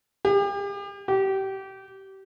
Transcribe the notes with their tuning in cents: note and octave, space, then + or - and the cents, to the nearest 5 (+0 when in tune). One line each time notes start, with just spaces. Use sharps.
G4 +40
G4 -25